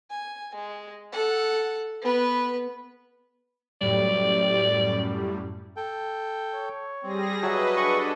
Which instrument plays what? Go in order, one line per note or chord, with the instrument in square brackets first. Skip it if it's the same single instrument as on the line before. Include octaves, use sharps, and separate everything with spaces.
[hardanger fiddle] G#5
G#3
A4 F#5
B3 B4
[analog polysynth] F#2 A2 G3 [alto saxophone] D5
[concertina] A4 G5
[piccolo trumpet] C#5
[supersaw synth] G3 G#4 A#6 [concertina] C4
[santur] F#3 [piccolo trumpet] G#4 [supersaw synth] B4 D#5 [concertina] E5 F#5 A5
[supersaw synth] D4 A4 [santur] G#4 [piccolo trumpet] C#6